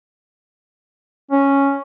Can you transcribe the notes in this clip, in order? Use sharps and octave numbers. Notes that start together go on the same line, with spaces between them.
C#4